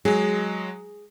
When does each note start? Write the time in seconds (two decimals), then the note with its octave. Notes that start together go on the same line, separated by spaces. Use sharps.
0.05 F#3 G#3 G#4